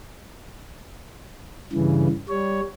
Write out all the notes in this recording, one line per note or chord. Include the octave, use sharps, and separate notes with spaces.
G2 C#3 E3
G3 C#5